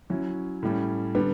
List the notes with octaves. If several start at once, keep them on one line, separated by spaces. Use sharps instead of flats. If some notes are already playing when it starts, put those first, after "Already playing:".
F#3 C#4 E4
A2 G3 C#4
D3 G3 B3